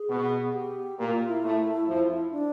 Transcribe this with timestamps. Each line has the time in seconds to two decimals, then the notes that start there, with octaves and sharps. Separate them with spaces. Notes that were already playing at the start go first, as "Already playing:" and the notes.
Already playing: G#4
0.09 B2 B3
0.54 G4
0.99 A#2 A#3 G4
1.14 F4
1.28 E4
1.43 A2 A3
1.87 F2 F3
2.31 D4